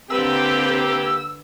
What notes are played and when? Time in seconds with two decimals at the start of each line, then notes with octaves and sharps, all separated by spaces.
0.10 D3 A#3 C4 G4 B4 E6